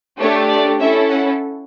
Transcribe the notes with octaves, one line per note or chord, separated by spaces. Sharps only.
A3 D4 G4 C#5
D5
C#4 E4 A4 E5
F#5